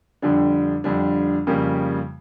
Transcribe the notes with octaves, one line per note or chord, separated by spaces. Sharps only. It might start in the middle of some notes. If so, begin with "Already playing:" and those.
F2 D3 G3 D4
F2 D3 G3 D4
F2 C#3 G3 A#3